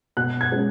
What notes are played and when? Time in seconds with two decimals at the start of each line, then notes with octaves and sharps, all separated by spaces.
0.17 B2 F#6
0.41 G#6
0.52 G#3 C#4